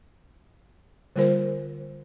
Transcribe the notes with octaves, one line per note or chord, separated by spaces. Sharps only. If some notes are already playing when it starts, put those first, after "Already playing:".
D3 G3 A#3 F4 A#4 C5